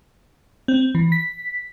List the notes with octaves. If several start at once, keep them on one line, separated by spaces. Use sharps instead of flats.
C4
E3
B6